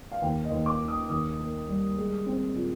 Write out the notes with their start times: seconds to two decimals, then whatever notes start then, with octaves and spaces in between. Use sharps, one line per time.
0.12 F5
0.22 D#2 G5
0.44 D#5
0.51 D#2
0.66 D6
0.80 D#3
0.88 D#6
1.09 D#2 D#6
1.39 A#3
1.68 G3
1.97 G#3
2.26 C4
2.55 A#2